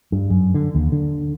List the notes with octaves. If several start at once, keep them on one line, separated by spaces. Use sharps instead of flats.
G2
F#2
D3
D#2
D3